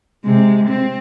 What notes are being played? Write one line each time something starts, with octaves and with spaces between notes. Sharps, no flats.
C3 G#3
C4